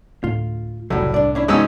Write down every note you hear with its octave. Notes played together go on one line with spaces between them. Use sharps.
D2 A2 A3 F4
F1 C2 A2 C#3 F#3 G3
C2 G2 D4 D5
C#4 D4 E4
G#2 C3 E3 F#3 C#4 E6